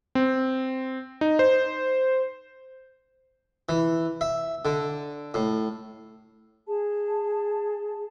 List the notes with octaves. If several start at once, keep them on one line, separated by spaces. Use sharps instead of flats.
C4
D#4
C5
E3
E5
D3
A2
G#4 A5